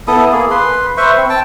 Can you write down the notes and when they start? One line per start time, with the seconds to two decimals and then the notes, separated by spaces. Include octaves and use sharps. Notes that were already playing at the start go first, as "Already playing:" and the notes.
0.07 B3 E4 A4 D#6
0.32 A#3 G#4
0.51 B4 C6
0.97 B4 C5 E5 C#6
1.18 C4
1.30 G5 A5